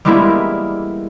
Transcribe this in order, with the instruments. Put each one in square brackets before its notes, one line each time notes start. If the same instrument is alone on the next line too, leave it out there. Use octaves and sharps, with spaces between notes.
[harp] G3 G#3 A#3 B3 E4